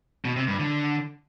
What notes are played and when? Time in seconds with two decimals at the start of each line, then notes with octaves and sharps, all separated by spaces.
0.25 B2
0.36 C3
0.48 G2
0.59 D3